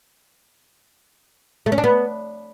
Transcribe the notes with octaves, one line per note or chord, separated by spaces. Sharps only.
A3
C#4
D4
B3